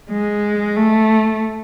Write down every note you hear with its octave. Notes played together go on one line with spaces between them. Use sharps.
G#3
A3